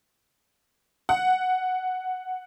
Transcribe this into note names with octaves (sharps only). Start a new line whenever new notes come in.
F#5